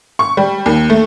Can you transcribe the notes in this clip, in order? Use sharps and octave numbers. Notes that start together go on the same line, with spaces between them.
C#6
G3
D#2
A3